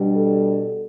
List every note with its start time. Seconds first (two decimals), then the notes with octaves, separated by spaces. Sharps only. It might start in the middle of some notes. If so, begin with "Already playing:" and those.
Already playing: B2 G3 D4
0.16 A4